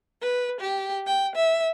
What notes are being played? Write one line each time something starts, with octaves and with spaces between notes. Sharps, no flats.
B4
G4
G5
E5